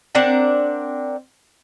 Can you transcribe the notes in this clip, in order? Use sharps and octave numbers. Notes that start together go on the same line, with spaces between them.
C4 D4 A#4 F#5